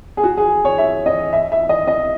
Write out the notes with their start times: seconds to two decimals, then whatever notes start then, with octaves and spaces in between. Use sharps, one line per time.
0.17 G#4
0.24 F#4
0.37 G#4
0.65 C#5
0.78 E5
1.06 D#5
1.33 E5
1.52 E5
1.69 D#5
1.88 D#5